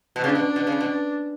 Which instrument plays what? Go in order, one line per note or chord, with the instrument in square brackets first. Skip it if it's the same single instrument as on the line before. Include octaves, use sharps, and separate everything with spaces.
[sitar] B2
[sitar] C#3 [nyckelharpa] D4
[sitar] B2
B2
C#3
B2